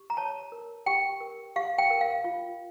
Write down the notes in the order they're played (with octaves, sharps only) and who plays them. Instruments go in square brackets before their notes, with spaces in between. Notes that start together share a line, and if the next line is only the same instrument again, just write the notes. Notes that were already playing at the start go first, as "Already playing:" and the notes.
Already playing: [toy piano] G4
A#5
C#5 A5
A#4
G4 G5
A#4
G4 F5
G5
A#4
F5
F4